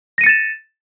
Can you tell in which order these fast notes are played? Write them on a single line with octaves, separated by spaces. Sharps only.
A#6 D#7 C#7 A6 E7